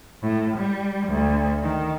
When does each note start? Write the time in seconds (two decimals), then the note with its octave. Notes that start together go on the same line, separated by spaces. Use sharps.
0.22 A2
0.57 G3
1.08 D2
1.62 D#3